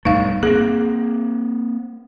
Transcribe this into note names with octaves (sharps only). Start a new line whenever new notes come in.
B1 G2 A3 D#4 F5
A#3 C4 G#4